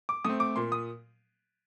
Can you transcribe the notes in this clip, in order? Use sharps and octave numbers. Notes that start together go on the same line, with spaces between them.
D6
A3 C4 D#6
D6
A#2 C6
D#6